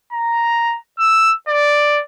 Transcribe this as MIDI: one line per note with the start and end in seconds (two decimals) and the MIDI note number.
0.13 0.78 82
0.99 1.33 88
1.48 2.02 74